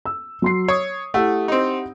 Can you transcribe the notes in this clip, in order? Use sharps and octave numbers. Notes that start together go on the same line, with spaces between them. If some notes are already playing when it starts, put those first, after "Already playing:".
E6
F#3 C6 C7
C#5 D#6
A3 E4 G4 F#5
C4 D#4